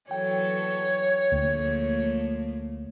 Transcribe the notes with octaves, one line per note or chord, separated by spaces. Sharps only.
E3 F#3 A4 C#5 G5
D2 F3 A3 A#3